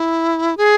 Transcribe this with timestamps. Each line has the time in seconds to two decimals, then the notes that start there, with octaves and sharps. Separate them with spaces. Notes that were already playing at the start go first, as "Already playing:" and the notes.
Already playing: E4
0.57 G#4